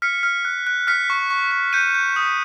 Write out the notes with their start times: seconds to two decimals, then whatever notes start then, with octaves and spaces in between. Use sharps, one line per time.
0.02 F6 B6 C#7
0.23 F6
0.45 F#6
0.67 F#6
0.87 F6 B6 C#7
1.10 C#6
1.30 C#6
1.51 C#6
1.73 G6 C#7 D#7
1.95 G6
2.16 D#6